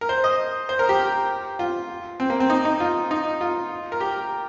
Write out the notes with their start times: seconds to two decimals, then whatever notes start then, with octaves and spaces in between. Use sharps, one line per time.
0.01 A#4
0.09 C5
0.24 D#5
0.69 C5
0.79 A#4
0.89 G4
1.59 F4
2.20 C4
2.30 A#3
2.40 C4
2.50 D#4
2.65 D#4
2.80 F4
3.11 D#4
3.41 F4
3.92 A#4
4.01 G4